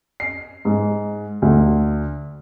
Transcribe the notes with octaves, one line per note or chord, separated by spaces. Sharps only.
C7
G#2
D2